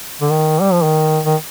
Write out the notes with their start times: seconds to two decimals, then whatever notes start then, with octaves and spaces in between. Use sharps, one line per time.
0.21 D3
0.31 D#3
0.61 G3
0.72 F3
0.83 D#3
1.25 D#3